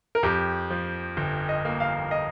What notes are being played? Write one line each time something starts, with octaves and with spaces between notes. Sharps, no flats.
A#4
F2 G4
F3
G1
D#5
A#3
F5
D#5